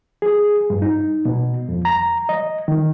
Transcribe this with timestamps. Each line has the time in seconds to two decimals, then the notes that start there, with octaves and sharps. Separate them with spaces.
0.22 G#4
0.70 G2
0.82 D#4
1.25 B2
1.69 F2
1.85 A#5
2.29 D#5
2.68 D#3